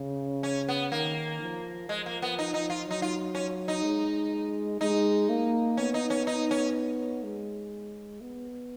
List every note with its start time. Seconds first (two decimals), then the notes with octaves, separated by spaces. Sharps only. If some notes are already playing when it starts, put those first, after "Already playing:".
Already playing: C#3
0.43 C#4
0.69 B3
0.92 D#3 A#3
1.41 F3
1.89 F3 G#3
2.06 A#3
2.22 B3
2.39 D#4
2.54 D#4
2.70 F4
2.87 F#3 D#4
3.02 F4
3.35 C#4
3.68 D#4
3.84 G#3
4.81 G#3 D#4
5.29 A#3
5.77 B3 C#4
5.94 D#4
6.10 C#4
6.27 D#4
6.51 C#4
7.23 G#3
8.21 B3